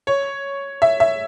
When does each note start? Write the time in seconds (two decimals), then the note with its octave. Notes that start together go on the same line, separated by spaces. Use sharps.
0.07 C#5
0.82 E5
1.00 E5